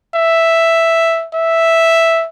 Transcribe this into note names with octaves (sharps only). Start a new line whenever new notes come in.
E5
E5